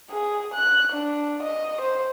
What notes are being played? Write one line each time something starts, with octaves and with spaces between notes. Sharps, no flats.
G#4
F#6
D4
D#5
C5